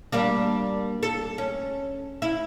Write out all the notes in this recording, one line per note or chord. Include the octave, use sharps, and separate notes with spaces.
G3 A#3 D4
A4
C#4
E4